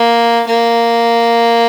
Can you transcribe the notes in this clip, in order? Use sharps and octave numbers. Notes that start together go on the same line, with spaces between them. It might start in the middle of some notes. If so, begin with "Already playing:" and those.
Already playing: A#3
A#3